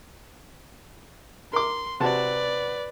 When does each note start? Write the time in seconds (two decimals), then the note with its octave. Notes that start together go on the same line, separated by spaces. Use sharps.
1.53 A#4 C6 D6
2.00 C3 F#4 B4 D5 A5